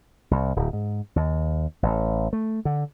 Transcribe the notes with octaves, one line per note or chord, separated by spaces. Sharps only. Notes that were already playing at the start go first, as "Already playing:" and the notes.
C2
D1
G#2
D#2
A1
A3
D3